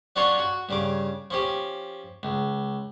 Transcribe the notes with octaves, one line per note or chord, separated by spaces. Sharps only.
F#3 C#4 D4 F4 C#5 F5
F#4
G2 C#3 D6
F3 C#4 G4
C#2